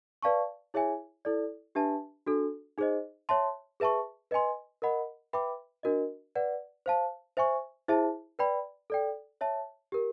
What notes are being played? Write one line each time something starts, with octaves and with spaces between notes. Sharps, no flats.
B4 D5 F5 A5 C#6
E4 G#4 C#5 E5 G#5
E4 A4 D5
D4 G4 B4 E5 A5
D4 F#4 A4
D#4 G#4 C5 D#5
C#5 E5 A5 C6
G#4 B4 E5 A5 C#6
B4 D#5 G#5 C6
A#4 D#5 F#5 B5
B4 E5 G5 B5 D6
D4 F#4 A#4 D#5
B4 D5 F#5
C5 F5 A5
C5 E5 G#5 C#6
E4 G#4 C5 E5 A5
B4 D5 G5 B5
A4 D5 G5
C#5 E5 A5
G4 A#4